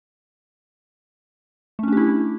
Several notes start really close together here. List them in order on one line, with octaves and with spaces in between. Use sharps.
A3 C#4 D4 G4 E4